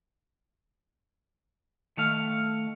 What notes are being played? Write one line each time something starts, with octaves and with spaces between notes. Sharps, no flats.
D#3 A3 F5